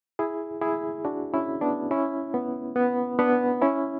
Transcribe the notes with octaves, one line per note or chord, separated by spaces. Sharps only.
E4 G#4
E4 G#4
D4 F#4
C#4 E4
B3 D4
C#4 E4
B3
B3
B3 D4
C#4 E4